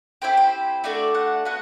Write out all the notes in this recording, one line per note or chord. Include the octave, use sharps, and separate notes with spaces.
C4 E4 G4 C5
C5
A3 D4 F#4 A4 D5
F#5
B3 F#4 F#5